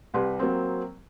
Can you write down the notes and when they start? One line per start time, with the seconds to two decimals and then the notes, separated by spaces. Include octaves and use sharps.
0.14 C2 G4 B4 C6
0.39 F#3 A#3 C4